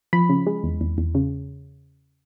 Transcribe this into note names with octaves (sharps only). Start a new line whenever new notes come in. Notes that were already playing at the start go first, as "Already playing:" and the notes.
F3 B5
C#3
G#3
E2
E2
E2
C#3